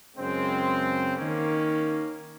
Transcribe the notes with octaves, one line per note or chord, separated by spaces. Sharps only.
F#2 C#3 G#3 C4
D#3 A#3 C#4